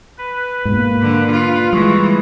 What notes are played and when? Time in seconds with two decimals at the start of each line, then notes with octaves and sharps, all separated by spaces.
0.18 B4
0.65 G#2 B2 A#3
1.02 D3
1.32 F4
1.73 E3 G3 G#3 C#6